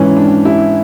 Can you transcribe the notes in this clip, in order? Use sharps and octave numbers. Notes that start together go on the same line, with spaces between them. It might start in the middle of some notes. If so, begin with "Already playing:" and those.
Already playing: G#2 E3 C#4
D4
E4